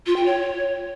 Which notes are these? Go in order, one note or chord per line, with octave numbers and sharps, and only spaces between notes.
F4
G5
C#5